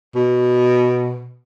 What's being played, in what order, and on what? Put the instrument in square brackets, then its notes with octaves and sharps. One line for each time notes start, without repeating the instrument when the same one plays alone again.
[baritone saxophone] B2